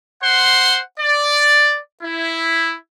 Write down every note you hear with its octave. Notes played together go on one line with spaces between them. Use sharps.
C5 F#5 C6
D5
E4